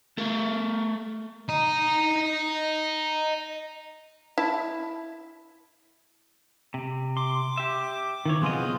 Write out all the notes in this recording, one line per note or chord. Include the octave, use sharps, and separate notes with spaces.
A3 A4 A#4
D#5 A#5
E4 A5
C3
C6 D6
G4 E5
D#3 E3 C#5
B1 C#3 B3 C4 F4 G#4 D#5